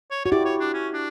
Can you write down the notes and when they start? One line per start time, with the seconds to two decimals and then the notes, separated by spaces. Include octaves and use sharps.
0.11 C#5
0.25 F#4 C#5
0.32 E4 G4 D5
0.45 C#5
0.60 D4
0.74 C#4
0.94 D4